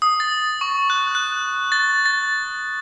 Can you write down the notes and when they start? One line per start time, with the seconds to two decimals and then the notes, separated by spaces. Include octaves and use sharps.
0.02 D#6
0.20 A6
0.61 C#6
0.90 F#6
1.15 F#6
1.72 A6
2.06 A6